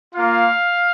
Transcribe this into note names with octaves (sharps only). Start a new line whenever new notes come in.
A#3 F4 F5